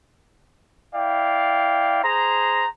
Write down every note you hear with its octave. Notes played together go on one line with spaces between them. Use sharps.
E4 D5 F5 G5
G#4 C5 A#5